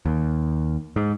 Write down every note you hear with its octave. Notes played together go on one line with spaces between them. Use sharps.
D#2
G#2